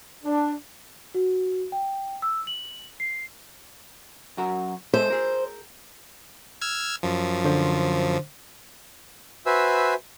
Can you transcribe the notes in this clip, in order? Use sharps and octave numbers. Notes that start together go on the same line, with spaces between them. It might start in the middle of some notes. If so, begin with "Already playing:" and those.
D4
F#4
G5
E6
F#7
C7
F#2 F#4 A#4
G#3 A4 C5 E5
G#4 A#4
E6 F6 G#6
F#2 F3
D3 C5
F#4 B4 C5 E5 G#5 E6